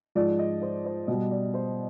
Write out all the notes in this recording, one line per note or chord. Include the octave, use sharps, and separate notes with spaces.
G#2 F3 D5
D#5
C5
C5
B2 G3 D#5
D5
C5